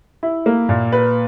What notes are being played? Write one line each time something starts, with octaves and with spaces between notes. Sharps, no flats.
E4
A#3
A#2
B4